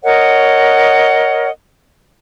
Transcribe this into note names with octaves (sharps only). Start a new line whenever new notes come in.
A#4 C#5 D#5 F#5